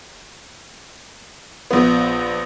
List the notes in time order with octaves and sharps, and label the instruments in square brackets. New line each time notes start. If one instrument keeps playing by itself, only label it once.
[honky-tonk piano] A#1 B3